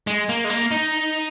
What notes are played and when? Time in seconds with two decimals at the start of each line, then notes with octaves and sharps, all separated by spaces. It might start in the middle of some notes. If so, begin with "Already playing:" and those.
0.07 G#3
0.29 A#3
0.44 G#3
0.50 A#3
0.71 D#4